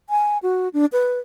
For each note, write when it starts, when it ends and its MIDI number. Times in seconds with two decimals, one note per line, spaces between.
0.10 0.38 80
0.43 0.69 66
0.74 0.86 62
0.93 1.19 71